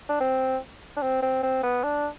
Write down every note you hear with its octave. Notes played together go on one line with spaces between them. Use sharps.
D4
C4
D4
C4
C4
C4
B3
D4